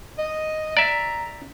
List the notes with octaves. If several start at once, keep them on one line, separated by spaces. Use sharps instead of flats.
D#5
D5 E5 A#5